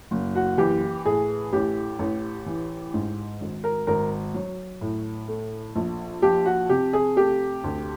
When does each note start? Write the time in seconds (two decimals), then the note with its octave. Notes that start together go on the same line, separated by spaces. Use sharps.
0.11 F#1
0.35 F#4
0.58 E3 G4
1.06 A2 G#4
1.53 A1 G4
1.99 A1
2.46 E3
2.94 G#2
3.41 G#1
3.64 A#4
3.87 G#1 A#4
4.34 F#3
4.81 A2
5.28 A3
5.76 A#1
6.22 F3 G4
6.46 F#4
6.69 C3 G4
6.93 G#4
7.16 A3 G4
7.64 D2